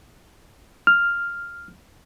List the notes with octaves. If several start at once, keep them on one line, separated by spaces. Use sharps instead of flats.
F6